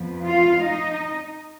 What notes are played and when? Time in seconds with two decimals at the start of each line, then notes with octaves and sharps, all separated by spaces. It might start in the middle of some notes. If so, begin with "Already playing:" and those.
Already playing: F2 F3 B3
0.24 F4 F5
0.61 D#4 D#5